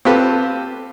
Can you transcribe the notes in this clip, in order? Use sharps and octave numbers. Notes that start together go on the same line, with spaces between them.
C4 F4 G4 A4 B4